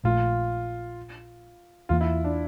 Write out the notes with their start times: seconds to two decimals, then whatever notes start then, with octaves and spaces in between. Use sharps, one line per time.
0.04 A#1 A#2 A3 F4
1.89 E2 E3 A#3 F4
2.01 E4
2.24 D4